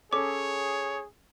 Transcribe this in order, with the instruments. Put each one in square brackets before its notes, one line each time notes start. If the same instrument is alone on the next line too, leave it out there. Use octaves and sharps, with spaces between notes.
[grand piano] C#4 A4 [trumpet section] G#4 [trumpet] C#5 [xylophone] D6